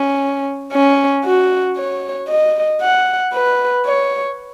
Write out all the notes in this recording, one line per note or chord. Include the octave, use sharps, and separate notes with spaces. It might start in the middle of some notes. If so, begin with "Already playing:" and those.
Already playing: C#4
C#4
F#4
C#5
D#5
F#5
B4
C#5